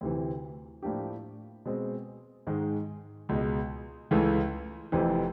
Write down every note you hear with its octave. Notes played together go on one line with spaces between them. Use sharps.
D2 C3 E3
A2 F3 A#3 D4 G4
B2 G#3 C4
G#2 D#3 G#3
C#2 B2 G#3
C#2 C#3 E3 A3
F1 F2 C3 E3